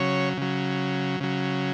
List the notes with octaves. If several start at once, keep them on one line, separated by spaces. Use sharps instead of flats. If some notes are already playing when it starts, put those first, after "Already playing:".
Already playing: C#3 F#3 C#5
C#3 F#3
C#3 F#3